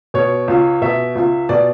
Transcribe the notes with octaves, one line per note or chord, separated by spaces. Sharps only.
B2 C#5
C#2
B2 E5
C#2
B2 D5